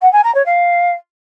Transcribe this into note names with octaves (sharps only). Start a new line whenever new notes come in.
F#5
G#5
A#5
C#5
F5